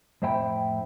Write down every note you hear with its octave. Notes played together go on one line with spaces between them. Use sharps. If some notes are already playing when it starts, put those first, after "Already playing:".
F2 A2 C5 E5 G5 B5